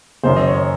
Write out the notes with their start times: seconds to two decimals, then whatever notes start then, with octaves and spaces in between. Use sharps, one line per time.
0.23 F#1 F#2 D#3 C5
0.36 D#5
0.47 C#5